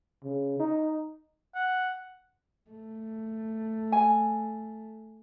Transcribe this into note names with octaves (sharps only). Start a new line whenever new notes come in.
C#3
D#4
F#5
A3
G#5